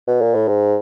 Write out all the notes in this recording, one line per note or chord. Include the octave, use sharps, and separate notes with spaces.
B2
A#2
A2
G#2